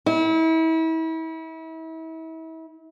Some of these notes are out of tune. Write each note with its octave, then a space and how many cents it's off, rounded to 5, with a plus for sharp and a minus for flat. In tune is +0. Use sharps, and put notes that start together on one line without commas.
E4 -35